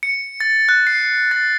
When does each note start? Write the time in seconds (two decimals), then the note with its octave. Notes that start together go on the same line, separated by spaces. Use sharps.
0.03 C#7
0.40 A6
0.69 F#6
0.87 C7
1.31 A6